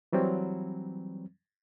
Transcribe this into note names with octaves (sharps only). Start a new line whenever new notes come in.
E3 F#3 G3 C4